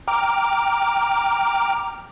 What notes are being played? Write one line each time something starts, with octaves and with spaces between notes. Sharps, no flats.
G5 A#5 D6 F6